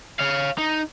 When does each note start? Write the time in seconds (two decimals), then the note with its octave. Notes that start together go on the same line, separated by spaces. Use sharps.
0.20 C#5 F5
0.59 D#4